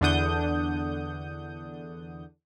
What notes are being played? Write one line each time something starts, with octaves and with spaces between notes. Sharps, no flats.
E2 D3 D4 F#5 D#6 G6